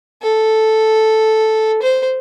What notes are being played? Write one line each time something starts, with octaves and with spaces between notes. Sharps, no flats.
A4
C5